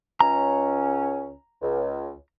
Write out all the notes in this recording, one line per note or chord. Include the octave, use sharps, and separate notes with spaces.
C#2 C#4 A#5
C#2